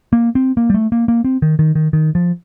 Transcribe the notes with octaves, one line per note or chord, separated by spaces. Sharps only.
A#3
C4
A#3
G3
A3
A#3
A#3
C4
D#3
D#3
D#3
D#3
F3